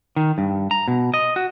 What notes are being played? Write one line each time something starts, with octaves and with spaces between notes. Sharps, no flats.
D#3
G2
A#5
B2
D#5
F#4